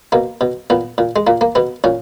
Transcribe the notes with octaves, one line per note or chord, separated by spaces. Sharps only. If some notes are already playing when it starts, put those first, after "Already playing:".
B2 A#3
B2
A#2 B3
A#2
G#3
A#2 A#3
A#3
B2 B3
A#2 C#4